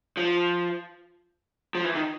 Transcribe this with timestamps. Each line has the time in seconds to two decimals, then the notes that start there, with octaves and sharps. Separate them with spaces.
0.17 F3
1.75 F3
1.84 E3
1.95 D#3